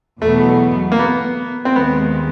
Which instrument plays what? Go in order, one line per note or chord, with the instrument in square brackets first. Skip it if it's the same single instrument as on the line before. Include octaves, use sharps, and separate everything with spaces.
[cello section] E2 B2 F#3 B3 [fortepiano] A3
[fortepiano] A#3
B3
C4
[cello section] D#2 D#3 G#3 [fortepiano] B3